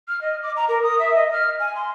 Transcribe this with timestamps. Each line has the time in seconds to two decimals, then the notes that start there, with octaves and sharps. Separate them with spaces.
0.08 F6
0.22 D#5
0.43 D6
0.56 A#5
0.69 A#4
0.83 D#6
0.99 E5
1.15 D#5
1.32 F6
1.60 G#5
1.75 C6